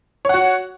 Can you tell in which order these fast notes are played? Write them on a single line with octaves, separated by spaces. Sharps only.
C#5 F#5 F#4